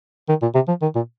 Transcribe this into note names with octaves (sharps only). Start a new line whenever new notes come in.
D#3
A#2
C3
F3
D#3
A#2